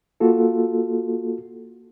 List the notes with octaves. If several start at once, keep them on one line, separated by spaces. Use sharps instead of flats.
A#3 F4 F#4 A4